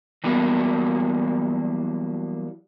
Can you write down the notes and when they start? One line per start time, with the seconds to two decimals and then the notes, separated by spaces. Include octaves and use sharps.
0.24 E3 F#3 G3 A#3 B3 F#4